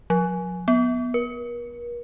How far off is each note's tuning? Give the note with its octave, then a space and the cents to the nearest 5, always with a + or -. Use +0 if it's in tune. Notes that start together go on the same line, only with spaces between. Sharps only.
F3 +45
B3 -10
A#4 +45